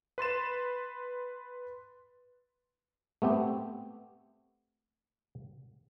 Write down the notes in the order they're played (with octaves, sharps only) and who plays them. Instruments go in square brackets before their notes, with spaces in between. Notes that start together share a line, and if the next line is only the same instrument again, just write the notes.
[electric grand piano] B4 C6 A6 E7
[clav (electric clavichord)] A3 B3 C4 G4